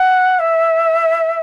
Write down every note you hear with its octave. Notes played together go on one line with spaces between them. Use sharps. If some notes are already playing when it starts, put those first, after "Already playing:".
Already playing: F#5
E5